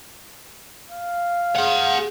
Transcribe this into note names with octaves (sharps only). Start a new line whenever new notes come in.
F5
G#4 F#5